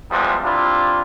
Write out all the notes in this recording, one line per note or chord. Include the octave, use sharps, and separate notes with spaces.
E2 F3 G3 G#3
C3 D4 E4 F4